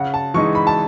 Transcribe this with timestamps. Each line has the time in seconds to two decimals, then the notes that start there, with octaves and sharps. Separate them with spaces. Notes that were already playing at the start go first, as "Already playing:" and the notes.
Already playing: C#3 F#5
0.14 A5
0.34 E3 G#3 D#4 C#6
0.55 B5
0.67 A5